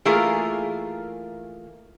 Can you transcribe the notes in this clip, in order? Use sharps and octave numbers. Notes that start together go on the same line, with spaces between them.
E3 A3 A#3 F4 G#4 A#4